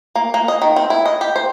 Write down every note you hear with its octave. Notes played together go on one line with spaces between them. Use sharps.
A#3
A#3
D#5
D#3
C4
E4
D#5
G4
C5